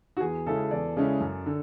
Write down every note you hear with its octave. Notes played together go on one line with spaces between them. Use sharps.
F#4
E2 G#4
C#3 G#3 C#4 E4 A4
E2 D5
C#3 G#3 C#4 E4
F#2
D3